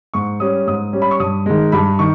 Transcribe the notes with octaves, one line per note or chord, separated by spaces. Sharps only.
G#2 C#6
G3 C#4 D#6
G#2 D#6
G3 C#4
B5
C#6
G2 D#6
D#3 G#3
G2 B5
D#3 C#6